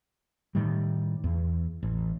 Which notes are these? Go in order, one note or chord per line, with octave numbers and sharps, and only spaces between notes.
A2 D#3 G3
E2
A1